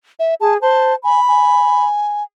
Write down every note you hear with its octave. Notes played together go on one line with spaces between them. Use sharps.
E5
G#4 A5
C5 A5
G#5 B5
G#5